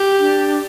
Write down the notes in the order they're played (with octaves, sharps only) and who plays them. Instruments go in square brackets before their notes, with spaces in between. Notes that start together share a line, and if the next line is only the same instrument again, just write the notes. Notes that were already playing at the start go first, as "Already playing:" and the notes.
Already playing: [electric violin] G4
[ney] D4